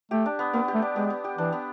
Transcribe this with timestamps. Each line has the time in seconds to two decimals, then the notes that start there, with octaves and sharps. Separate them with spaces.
0.11 A3 G4
0.26 D4
0.39 B3
0.53 A#3 B3
0.68 G4
0.74 A3
0.82 D4
0.96 G#3 B3
1.10 B3
1.24 G4
1.38 E3 D4
1.53 B3